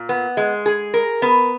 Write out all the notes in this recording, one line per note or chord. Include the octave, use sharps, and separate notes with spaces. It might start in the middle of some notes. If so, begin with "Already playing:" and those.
Already playing: A#2
B3
G#3
G#4
A#4
B3